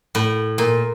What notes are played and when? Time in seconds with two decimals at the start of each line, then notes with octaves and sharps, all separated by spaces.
0.15 A2
0.58 A#2